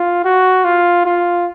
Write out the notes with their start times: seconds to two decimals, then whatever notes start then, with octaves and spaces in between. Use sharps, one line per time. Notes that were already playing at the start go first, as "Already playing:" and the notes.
Already playing: F4
0.25 F#4
0.64 F4
1.05 F4